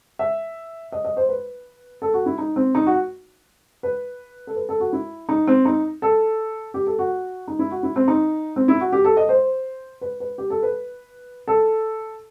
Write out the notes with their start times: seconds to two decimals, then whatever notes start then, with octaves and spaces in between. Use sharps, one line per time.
0.19 E5
0.92 D#5
1.05 D#5
1.17 C5
1.29 B4
2.02 A4
2.14 F#4
2.26 E4
2.38 D#4
2.56 C4
2.75 D#4
2.86 F#4
3.83 B4
4.47 A4
4.56 B4
4.69 A4
4.80 F#4
4.93 E4
5.29 D#4
5.47 C4
5.65 D#4
6.02 A4
6.74 G4
6.87 A4
6.99 F#4
7.48 D#4
7.59 E4
7.71 F#4
7.83 E4
7.96 C4
8.08 D#4
8.56 C4
8.68 E4
8.80 F#4
8.93 G4
9.05 A4
9.17 D#5
9.29 C5
10.01 B4
10.20 B4
10.38 G4
10.50 A4
10.63 B4
11.48 A4